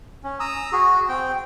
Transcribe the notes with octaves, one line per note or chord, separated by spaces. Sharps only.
C#4
A#5 D#6 E6
F#4 G#4
C4 G5